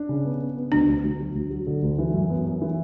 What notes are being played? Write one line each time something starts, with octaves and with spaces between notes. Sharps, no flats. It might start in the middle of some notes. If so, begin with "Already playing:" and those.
Already playing: D4
C#3
B3
B3
B3
D2 D4
D2
D2
F#3
D2
F#3
D3
D2
E3
F#2
B3
F#2
E3